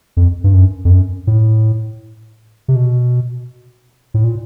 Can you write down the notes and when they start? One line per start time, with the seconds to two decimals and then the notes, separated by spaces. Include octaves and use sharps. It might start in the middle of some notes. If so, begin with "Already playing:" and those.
0.17 F2
0.44 G2
0.54 F#2
0.85 F2
0.90 F#2
1.27 A2
2.68 C3
2.76 B2
4.14 A2
4.24 A#2